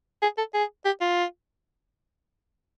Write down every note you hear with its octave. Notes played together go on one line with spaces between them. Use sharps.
G#4
A4
G#4
G4
F4